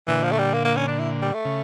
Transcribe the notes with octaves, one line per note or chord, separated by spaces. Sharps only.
A#2 D3 E3
F3
A3
G3
A#3
A#3
C#4
D4
E4
G3
A3
C#3